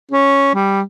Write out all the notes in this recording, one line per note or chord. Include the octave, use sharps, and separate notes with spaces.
C#4
G3